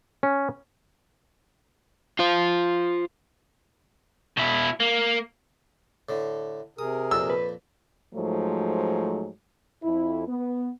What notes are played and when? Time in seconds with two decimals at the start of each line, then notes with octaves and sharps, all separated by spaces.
0.23 C#4
2.19 F4 C5
4.37 B2 E4
4.80 A#3
6.09 A2 D3
6.79 C3 G#4 A#4 D#6
7.11 F2 A#2 E6
7.30 B4
8.14 G#2 F3 F#3 A3
9.83 F2 E4
10.27 B3